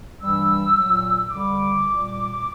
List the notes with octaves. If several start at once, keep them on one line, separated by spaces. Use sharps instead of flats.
G2 E3 G3 E6
A#2 F#3
E2 D3 G3 D6
A#2 G3